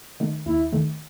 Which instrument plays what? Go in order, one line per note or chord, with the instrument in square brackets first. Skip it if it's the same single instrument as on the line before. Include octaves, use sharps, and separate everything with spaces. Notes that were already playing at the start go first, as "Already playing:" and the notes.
[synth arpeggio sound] D#3 A3
[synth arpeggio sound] D#2 [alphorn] E4
[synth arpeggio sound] D#3 A3